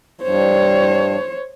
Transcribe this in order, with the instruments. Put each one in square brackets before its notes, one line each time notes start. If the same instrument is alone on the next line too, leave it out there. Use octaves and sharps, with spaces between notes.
[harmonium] G2 [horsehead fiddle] C5 C#5